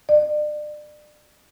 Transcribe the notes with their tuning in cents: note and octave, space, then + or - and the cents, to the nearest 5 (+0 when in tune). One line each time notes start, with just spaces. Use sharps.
D5 +35